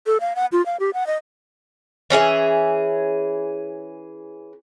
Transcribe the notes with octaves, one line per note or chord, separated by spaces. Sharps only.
A4
F5
F#5
F4
F5
G4
F#5
D#5
E3 C#4 G#4 E5